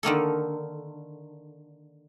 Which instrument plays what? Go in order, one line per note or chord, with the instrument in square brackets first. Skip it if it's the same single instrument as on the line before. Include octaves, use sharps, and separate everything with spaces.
[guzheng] D3 D#3 A#3 A4